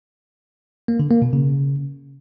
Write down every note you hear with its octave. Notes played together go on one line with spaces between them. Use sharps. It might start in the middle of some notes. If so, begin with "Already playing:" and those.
A#3
D3
A#3
B2
C#3